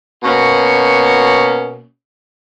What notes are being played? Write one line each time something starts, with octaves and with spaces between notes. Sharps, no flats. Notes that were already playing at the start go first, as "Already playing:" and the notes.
B2 A#3 C#4 F#4